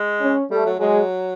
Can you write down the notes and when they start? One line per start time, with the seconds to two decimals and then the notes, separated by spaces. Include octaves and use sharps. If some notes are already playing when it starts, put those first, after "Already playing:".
Already playing: G#3
0.22 C#4
0.51 G3 A3
0.66 F#3
0.80 F#3 G#3